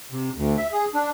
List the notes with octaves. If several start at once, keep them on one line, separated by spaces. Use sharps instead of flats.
C3
D2
E5
G#4
D4